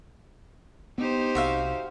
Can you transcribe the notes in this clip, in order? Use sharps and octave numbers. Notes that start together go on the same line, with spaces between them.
B3 D#4 G4 C5
C2 F#4 E5 F5